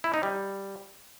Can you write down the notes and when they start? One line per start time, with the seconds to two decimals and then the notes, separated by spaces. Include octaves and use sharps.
0.04 E4
0.14 D#4
0.23 G3